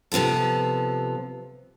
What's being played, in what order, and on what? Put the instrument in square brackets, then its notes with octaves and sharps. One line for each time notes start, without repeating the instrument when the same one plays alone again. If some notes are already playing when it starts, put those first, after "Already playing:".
[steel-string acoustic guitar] C3 F3 B3 F4 A4